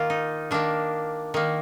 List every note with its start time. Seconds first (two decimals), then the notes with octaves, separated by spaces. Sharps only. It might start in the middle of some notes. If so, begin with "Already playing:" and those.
Already playing: D#3 A#3 F4
0.10 D#4
0.51 D#3 A#3 D4
1.34 D#3 A#3